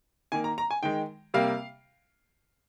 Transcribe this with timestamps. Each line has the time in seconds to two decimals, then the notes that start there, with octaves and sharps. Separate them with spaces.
0.32 D#3 A#3 G#5
0.44 A#5
0.58 A#5
0.71 G#5
0.83 D#3 G#3 G5
1.34 C3 G3 A#3 F5